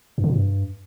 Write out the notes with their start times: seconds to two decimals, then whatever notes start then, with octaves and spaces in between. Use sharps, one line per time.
0.18 G2
0.24 D3
0.30 A#2
0.36 G2